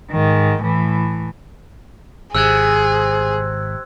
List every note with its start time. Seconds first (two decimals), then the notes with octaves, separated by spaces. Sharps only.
0.11 G#2 D#3
0.62 A2 E3
2.35 G#1 C3 G#4 E6 F#6 G#6